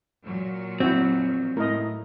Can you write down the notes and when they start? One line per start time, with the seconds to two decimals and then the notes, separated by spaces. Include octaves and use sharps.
0.24 A#2 F#3
0.80 F2 C4 E4 F#4
1.57 A2 A#4 D#5